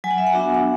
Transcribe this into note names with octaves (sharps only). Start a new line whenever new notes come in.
F#3 G#5
F#5
E5
F#5
B3 D4 F#4
F#5